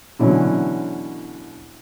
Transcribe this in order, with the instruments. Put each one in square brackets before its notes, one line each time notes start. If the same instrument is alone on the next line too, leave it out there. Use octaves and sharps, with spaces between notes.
[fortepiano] B2 D3 E3 F#3 C#4